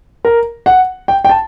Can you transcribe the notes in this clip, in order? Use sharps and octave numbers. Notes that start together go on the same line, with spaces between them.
A#4
F#5
G5
G5
A5